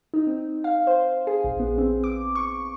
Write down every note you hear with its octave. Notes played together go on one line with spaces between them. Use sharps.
D#4
C4
F5
C5
G#4
A#1
B3
C4
D6
C#6